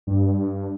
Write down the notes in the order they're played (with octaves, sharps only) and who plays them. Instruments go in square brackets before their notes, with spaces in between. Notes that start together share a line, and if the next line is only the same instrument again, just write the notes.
[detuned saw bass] G2